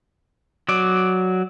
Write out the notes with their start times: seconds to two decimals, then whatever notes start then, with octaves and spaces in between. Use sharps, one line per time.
0.69 F#3 D5